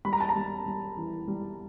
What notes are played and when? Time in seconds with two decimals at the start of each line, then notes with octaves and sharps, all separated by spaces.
0.05 G3 B5
0.13 A#5
0.20 A5
0.29 A#5
0.36 G3
0.66 G3
0.97 E3
1.28 G3